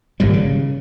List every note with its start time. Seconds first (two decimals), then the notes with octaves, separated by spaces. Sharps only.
0.20 G#1 A#2 G3
0.33 C#3